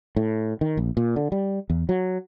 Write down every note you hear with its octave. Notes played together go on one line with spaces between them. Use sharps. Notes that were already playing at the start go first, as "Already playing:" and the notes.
A2
D#3
A#1
A#2
D3
G3
E2
F#3